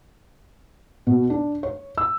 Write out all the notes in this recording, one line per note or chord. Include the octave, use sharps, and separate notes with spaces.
B2
D4
C#5
E6